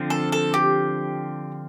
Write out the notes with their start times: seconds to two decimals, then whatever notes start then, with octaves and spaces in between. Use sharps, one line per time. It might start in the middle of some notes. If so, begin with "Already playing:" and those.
Already playing: D3 F3 C4
0.10 A4
0.32 A4
0.54 G4